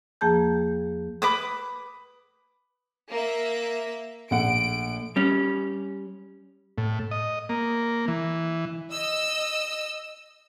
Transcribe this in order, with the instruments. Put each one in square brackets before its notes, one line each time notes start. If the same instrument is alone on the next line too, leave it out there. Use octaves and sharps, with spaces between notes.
[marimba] E2 F3 A#3 G#4 A5 G6
[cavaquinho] B4 D6 D#6
[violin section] A#3 E5
[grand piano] A#1 A3 F#5 [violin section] D7
[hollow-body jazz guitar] G3 C#4
[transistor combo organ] A2
D#5
A#3
E3
[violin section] D#5 E6